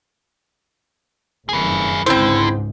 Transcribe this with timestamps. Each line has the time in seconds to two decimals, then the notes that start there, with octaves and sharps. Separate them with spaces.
1.49 F1 F#2 D#3 G#4 B4
2.06 G#1 C#2 G#2 D3 C4 E4 C5